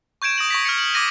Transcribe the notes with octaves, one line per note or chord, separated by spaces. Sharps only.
C#6 G6 G#6 D7 E7
D#6 A#6 F#7
C#6 A#6 B6
F6 G#6 C#7
F#7
D6 G#6 A#6 D#7